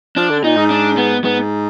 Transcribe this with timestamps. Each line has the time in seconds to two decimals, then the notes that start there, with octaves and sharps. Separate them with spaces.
0.17 F3 D4
0.30 D3
0.44 A#2 D#4
0.57 G#2
0.71 D4
0.97 B3
1.24 G#2 B3